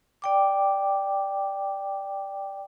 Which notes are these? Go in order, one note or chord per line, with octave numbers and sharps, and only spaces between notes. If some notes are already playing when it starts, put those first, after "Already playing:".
D5 G5 D6